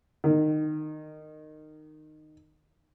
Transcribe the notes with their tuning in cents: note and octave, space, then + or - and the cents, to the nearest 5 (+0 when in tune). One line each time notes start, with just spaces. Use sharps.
D#3 -15